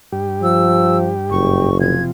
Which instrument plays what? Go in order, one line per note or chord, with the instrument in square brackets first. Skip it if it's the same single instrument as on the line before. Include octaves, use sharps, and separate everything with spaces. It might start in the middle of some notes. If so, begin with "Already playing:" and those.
[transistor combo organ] G2 G4
[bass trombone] F3 [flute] E6
[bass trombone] F#1 [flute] C#6
[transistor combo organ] C3 F3 [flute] G#6